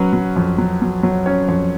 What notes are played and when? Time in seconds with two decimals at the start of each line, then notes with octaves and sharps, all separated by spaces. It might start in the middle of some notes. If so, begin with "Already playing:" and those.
Already playing: F#3 C#4 B4
0.13 F#3
0.36 F2
0.58 F#3
0.82 F#3
1.03 F#3 C#5
1.26 C#4 C#5
1.48 F2 C#5